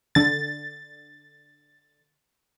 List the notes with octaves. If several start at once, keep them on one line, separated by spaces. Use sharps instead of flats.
D3 A6